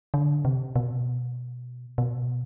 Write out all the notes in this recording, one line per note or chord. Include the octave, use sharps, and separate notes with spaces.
D3
C3
B2
B2